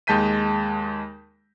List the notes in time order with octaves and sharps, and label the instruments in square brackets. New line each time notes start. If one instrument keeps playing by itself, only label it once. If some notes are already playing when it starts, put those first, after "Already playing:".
[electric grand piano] D#2 G#3 A5 G6 B6 D#7